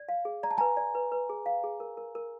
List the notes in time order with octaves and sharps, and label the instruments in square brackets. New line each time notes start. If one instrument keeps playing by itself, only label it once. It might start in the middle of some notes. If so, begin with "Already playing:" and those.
Already playing: [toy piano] D5
F5
G#4
[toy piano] D5 [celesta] A#5
[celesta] A5
[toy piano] B4 [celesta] G#5 A#5
[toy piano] D5
B4
B4
G#4
F5
G#4
A#4
A#4
A#4